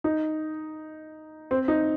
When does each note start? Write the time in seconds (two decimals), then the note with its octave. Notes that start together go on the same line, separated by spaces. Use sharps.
0.04 D#4
1.51 C4
1.68 D#4